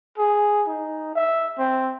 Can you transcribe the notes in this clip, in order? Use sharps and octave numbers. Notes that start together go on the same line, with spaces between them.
G#4
D#4
E5
C4